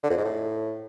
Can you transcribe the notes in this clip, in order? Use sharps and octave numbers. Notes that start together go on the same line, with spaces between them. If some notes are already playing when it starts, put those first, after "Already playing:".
D3
F2
G#2
A2